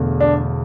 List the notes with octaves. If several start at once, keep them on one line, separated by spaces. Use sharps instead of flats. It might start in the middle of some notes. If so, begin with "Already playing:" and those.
Already playing: E1 E2 D3 A3
D4